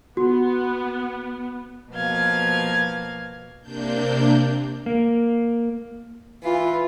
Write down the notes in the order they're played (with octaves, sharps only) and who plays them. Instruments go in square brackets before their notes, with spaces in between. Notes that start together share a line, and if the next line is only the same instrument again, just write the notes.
[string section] B3 [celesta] F#4
[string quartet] B2 F3 A#3 F5 G#6
[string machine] C3 A#3 D4 G6
[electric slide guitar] A#3
[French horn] E3 [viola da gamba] F4